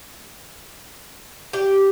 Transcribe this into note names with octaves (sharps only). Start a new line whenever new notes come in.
G4